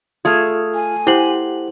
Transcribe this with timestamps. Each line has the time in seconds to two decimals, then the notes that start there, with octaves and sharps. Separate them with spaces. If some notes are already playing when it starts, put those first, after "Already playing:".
0.25 A3 F4 G#4 A4 F6
0.74 G#5
1.07 E4 G4 C5 F#5 C6 F#7